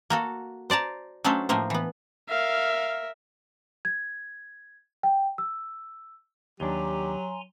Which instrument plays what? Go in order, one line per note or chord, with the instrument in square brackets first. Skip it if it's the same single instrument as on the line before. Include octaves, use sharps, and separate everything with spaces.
[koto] A#3 F#4 A4
C5 D5 A5 A#5
F#3 A3 C#4 D4 A4 C5
A2 F3 A3 A#3 C5
E3 B3
[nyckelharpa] A#4 E5 [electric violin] F5
[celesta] G#6
G5
E6
[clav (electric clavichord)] D#2 D4 [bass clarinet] F#3 [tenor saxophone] G4 [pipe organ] G#5 A#5 C6